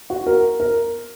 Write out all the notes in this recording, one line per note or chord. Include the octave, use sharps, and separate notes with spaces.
F#4
A#4
A#4